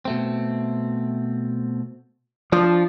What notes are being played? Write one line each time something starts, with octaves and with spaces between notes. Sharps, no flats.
B2 A3 C4
F3 D4